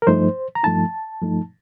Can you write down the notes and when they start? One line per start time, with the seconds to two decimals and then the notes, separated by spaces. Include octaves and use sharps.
0.02 A#4
0.07 G2 F3 A3 D#4 C5
0.55 A#5
0.63 G2 F3 A3 D#4 A5
1.21 G2 F3 A3 D#4